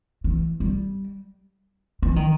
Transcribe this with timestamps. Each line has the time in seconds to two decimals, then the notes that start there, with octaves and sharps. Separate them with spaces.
0.24 E3
0.60 G3
2.02 E3
2.16 D#3